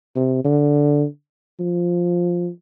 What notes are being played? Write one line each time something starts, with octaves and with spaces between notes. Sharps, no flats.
C3
D3
F3